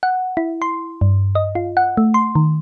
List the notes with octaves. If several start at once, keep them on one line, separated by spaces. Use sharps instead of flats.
F#5
E4
C6
G2
D#5
F4
F#5
A3
C6
D#3